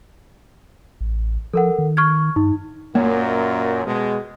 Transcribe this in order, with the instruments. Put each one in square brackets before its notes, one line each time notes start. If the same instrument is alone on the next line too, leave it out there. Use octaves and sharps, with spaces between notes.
[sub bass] A1
[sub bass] F3 [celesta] A4 A#4 F#5
[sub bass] D#3
[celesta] C#6 F6 G#6
[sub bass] G2 [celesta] D#4
[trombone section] F#2 A#2 [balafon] A#3
[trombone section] B2 G#3